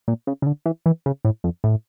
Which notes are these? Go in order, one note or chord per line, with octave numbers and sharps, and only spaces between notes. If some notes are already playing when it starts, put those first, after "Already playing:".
A#2
C#3
C#3
D3
E3
E3
C#3
A2
F2
A2